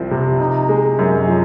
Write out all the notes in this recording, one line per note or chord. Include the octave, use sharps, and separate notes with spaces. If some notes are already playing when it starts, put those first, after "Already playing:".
Already playing: C2 F3 C4
C3
D#4
G#3
F#2
F3